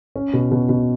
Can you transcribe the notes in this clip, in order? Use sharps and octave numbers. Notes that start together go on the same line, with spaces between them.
C#4
B2
B2
B2